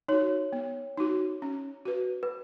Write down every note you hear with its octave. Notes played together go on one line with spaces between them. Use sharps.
D#4 F#4 C#5
B3
D#4 F#4
C#4
F#4 B4
B4